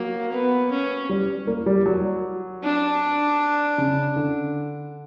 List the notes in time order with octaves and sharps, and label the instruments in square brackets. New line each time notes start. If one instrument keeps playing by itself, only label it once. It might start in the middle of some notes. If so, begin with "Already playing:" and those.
Already playing: [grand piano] F#3 [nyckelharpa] A#3
[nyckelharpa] B3
C#4
[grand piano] G3
A#3
G3
F#3
[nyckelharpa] D4
[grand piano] C#3
D3